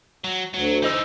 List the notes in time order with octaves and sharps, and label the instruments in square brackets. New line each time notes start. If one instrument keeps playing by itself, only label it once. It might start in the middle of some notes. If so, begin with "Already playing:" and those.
[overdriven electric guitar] F#3
[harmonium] D2 [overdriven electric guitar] F#3
[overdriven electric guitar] E3 D#4 [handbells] C5 D#5 E6